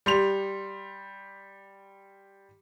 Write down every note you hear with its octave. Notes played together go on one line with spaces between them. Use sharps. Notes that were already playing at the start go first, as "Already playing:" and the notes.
G3 C6 F7